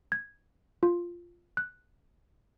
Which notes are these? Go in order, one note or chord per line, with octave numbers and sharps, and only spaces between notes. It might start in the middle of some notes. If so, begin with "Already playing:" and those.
G#6
F4
F#6